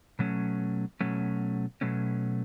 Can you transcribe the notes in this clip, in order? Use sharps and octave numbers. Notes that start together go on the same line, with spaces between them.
B2 F#3 A3 C#4
B2 F#3 A3 C#4
B2 F#3 A3 C#4